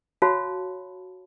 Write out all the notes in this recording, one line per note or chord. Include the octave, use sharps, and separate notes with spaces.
F#4 C#5 F5 A5 B5